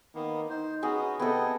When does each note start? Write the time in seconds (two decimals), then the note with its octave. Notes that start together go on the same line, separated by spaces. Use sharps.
0.15 D#3 A#3 B3
0.50 D#4 C5
0.83 B3 C#4 F#4 G#4
1.19 C3 B3 A4 D#5 G5 G#5